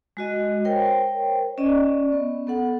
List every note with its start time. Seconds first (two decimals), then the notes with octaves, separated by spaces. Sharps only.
0.17 G#3 F#4 D#5
0.65 A#4 C5 C#5 G5
1.58 C#4 D5 D#5
2.12 B3
2.47 B3 A4 F#5